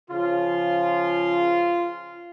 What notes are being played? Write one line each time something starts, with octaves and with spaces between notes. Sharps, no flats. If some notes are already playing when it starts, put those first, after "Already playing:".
C#3 F3 F4